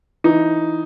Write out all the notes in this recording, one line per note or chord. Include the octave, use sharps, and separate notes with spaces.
E3 D#4